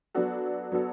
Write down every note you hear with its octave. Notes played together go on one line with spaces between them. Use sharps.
F#3 B3 D4 F#4 A4
F#3 B3 D4 F#4 A4